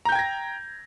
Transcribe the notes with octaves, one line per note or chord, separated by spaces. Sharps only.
G5 A#5 G6 G#6 A#6